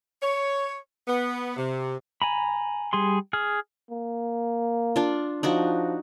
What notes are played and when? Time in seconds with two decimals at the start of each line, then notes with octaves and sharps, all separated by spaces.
0.22 C#5
1.08 B3
1.57 C3
2.22 G#5 A#5 B5
2.93 G3 G#4 C6
3.33 G#4 F6
3.91 A#3
4.96 D4 F4
5.43 F3 D4 D#4 F#4